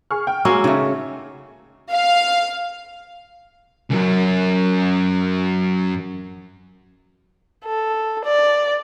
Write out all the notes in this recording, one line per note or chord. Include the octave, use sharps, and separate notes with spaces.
G#4 C#6 F6
G5
G#3 A#3 C#4 F#4 G#5 E6
C#3 A3 D#4
F5
C#2 F#2
A4
D5